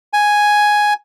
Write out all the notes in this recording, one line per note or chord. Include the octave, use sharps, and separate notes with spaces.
G#5